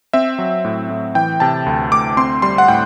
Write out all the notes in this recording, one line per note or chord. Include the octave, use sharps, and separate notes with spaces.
C4 E5
F#3
A2
A2
E3 G5
C3 A5
D2
D2 D6
C4 C6
G3 C6
F#5
A2 G5